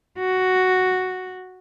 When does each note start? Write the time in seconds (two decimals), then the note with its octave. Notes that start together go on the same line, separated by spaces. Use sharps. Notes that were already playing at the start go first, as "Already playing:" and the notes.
0.18 F#4